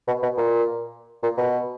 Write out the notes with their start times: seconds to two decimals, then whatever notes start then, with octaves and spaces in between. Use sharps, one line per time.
0.07 B2
0.23 B2
0.37 A#2
1.23 A#2
1.37 B2